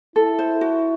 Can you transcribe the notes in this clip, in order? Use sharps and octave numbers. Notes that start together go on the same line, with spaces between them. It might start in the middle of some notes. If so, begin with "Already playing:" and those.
E4 A4
C5
F#4